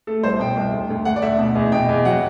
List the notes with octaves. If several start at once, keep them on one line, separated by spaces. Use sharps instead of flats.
A3 A4
C2 C5
B2 G5
C2
D2
D2
D2 F#5
D5
D2 E5
B2
E2
B2 G5
E2
F#3 F#5